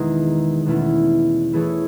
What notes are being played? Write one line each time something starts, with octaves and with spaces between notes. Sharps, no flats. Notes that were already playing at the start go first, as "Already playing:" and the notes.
Already playing: E2 B2 D#3 G#3 D#4
E2 B2 A3 C#4 E4
E3 A3 E4 G#4 C#5